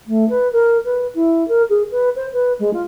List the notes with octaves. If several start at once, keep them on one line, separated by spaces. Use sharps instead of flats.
A3
B4
A#4
B4
E4
A#4
G#4
B4
C5
B4
G#3
F4